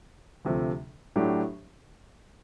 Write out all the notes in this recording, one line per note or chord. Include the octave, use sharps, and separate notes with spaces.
D2 C3 F3 A3
A2 F#3 A3 D4 G4